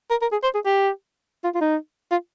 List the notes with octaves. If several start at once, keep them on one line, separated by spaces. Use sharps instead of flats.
A#4
A#4
G#4
C5
G#4
G4
F4
F4
D#4
F4